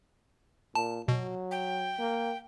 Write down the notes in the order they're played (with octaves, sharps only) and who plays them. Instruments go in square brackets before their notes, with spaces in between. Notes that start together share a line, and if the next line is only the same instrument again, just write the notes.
[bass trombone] A#2 [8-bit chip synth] A5
[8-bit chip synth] B2 [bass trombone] F#3
[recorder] G5
[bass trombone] A#3